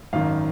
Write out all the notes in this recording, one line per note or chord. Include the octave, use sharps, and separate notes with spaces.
G#1 F#2 D#3 F5